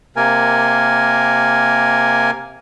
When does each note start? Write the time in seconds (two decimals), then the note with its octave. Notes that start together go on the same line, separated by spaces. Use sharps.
0.16 C3 A#3 A#4 G#5